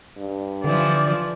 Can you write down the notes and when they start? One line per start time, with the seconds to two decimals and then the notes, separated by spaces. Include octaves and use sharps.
0.17 G2
0.64 D3 E3 F3 D5